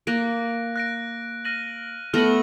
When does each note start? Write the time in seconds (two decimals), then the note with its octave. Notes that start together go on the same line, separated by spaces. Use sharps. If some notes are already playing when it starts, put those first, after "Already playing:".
0.07 A#3 F#6 A#6 D7
0.76 F#6 A#6 D7
1.45 F6 A#6 D#7 F#7
2.13 A3 B3 F6 A#6 D#7 F#7